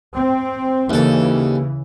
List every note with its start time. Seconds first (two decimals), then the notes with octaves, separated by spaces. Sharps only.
0.15 C4
0.90 D#2 C#3 E3 A4